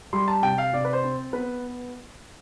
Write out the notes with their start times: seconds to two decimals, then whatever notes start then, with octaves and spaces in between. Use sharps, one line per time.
0.13 G3 C6
0.28 A5
0.43 C3 G5
0.58 F5
0.73 C3 D5
0.85 B4
0.93 C5
1.04 C4
1.33 B3 B4